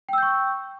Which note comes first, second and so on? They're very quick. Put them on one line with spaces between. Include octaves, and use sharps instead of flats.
G5 E6 G6 C#6